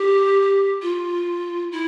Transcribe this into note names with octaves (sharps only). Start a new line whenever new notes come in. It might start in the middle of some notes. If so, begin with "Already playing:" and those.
Already playing: G4
F4
E4